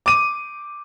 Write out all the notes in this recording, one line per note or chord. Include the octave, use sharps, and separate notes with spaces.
D6 D#7